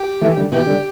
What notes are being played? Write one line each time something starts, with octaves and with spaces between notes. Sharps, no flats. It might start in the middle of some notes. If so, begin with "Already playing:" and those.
Already playing: G4
E3 A3
D3 G3
B2 E3 G4
D3 G3